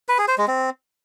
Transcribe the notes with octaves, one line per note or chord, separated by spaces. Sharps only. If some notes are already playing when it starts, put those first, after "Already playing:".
B4
G#4
C5
G#3
C4